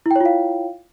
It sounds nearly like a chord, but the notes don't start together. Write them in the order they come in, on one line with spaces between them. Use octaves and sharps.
E4 G5 C#5 F4 F5